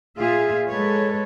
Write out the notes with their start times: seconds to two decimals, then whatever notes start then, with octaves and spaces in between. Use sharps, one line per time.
0.19 A#2 F4 G#4 E5 F5
0.68 G#3 A4 B4 C#5